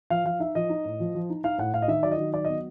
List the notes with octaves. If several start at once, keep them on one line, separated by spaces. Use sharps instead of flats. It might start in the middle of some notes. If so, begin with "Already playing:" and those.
F3 F5
F3 F5
D#4 E5
F3 D#5
D#4
A2
F3
F3
D#4
D#4 F5
A2 F#5
A2 F5
D#5
D#3 E5
F#3 D5
D#5
D#3
F#3 D5
B3 D#5